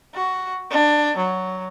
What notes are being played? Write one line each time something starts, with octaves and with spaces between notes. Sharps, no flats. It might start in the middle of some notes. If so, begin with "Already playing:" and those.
F#4
D4
F#3